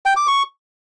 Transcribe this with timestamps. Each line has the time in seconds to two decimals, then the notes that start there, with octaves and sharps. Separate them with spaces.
0.06 G5
0.16 D6
0.27 C#6